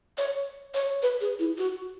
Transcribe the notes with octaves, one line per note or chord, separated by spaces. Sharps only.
C#5
C#5
B4
G#4
E4
F#4